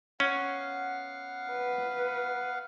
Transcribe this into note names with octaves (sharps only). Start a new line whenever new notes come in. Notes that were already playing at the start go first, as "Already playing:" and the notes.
B3 C#4 F5 F#5
B4